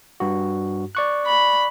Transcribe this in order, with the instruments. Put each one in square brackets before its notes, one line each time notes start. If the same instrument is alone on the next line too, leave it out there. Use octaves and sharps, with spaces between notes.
[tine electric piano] G2 F#4
D5 C#6 F#6
[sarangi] B5